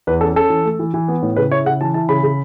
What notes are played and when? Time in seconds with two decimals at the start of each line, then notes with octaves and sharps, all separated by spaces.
0.07 E2 B4
0.21 C#4 A4
0.36 C#4 A4
0.50 E3
0.65 A3
0.79 E3
0.94 E3
1.08 B3
1.22 A2
1.36 C#3 B4
1.51 E4 C#5
1.66 C#3 F#5
1.81 E3 A5
1.94 E4 A5
2.09 C#3 B5
2.23 C#3